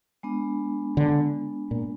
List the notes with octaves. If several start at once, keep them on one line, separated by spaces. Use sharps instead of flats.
G#3 B3 D4
D3
A#2